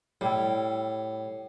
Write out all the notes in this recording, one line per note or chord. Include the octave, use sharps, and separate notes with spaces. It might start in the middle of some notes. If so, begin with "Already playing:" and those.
A2 G3 E4